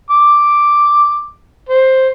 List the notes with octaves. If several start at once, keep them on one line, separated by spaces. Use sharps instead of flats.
D6
C5